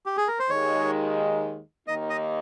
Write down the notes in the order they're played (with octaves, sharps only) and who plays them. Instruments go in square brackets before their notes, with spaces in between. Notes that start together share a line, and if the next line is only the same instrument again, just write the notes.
[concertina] G4
G#4
A#4
C5
[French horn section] D#2 D#3 G#3 [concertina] C#5
[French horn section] D#2 D#3 A#3 D#4 [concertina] D#5
[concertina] D#5